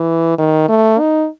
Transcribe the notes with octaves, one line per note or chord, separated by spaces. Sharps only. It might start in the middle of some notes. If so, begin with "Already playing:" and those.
Already playing: E3
D#3
A3
D#4